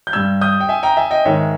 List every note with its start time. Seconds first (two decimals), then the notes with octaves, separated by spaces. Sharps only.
0.07 G6
0.13 G2 G3 E6 G#6
0.41 D#6 G6
0.60 G5
0.69 E5 G#5
0.83 G5 A#5
0.97 E5 G#5
1.11 D#5 G5
1.25 G#2 D#3 G#3 C#5 E5